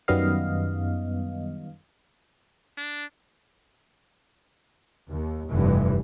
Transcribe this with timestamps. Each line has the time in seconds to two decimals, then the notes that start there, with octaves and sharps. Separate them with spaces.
0.08 F#2 D#3 G3 B3 D#5 F5
2.78 D4
5.10 D#2
5.49 F1 G2 E3